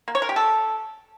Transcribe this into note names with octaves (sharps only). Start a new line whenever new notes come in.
A#3
C#5
A#4
G4
A4